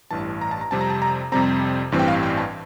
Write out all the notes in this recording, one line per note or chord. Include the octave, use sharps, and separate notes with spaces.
A1 G2 E3 A5
A#5
A5
A#5
F2 C3 G3 C4 A5
A#5
A5
A#5
F2 C3 G3 C4 A#5
A1 G2 E3 G3 C4
G5
F5
G5
A5